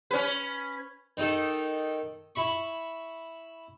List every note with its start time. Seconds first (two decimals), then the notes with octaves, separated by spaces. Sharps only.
0.11 C#4 B4
1.17 D#3 D#4 A4
2.35 E4 B5 C#6